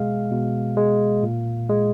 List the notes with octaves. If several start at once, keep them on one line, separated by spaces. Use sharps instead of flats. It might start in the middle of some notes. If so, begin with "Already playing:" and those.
Already playing: B2 G#3 F5
B2
G#3
A#2
G#3